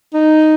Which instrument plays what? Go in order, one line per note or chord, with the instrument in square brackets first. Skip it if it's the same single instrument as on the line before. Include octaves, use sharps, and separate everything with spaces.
[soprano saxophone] D#4